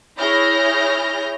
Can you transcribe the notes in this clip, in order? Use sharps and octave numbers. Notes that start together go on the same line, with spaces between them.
E4 G#4 C#5 F6 G6 A#6